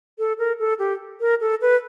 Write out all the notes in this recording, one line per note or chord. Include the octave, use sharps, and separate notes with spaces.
A4
A#4
A4
G4
A#4
A4
B4